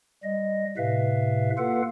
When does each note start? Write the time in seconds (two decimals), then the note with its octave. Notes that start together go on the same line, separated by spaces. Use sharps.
0.23 G3 D#5
0.77 A2 C3 B4 E5 F5
1.58 A#3 F4 A4 B4 F5 F#5